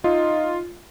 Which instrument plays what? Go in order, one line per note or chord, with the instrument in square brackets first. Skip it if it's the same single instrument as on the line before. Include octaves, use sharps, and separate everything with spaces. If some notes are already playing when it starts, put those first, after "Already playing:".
[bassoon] D#4 [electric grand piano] F4